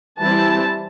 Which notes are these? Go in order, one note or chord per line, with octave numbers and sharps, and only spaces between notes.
E3 G3 C4 E4 A5